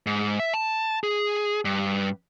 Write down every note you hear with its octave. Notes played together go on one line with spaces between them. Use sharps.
G#2
E5
A5
G#4
G2